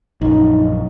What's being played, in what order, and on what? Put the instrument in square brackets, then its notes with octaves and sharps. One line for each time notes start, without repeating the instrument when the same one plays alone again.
[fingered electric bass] A#1 F#2 [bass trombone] D#4